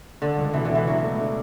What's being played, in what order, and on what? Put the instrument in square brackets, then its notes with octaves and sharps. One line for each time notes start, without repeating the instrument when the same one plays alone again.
[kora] D3 [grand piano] D4
[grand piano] C#2
[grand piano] B2 [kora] E3
[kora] D3
[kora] E3 [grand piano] D4
[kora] F#3 [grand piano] D4
[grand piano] A3
D4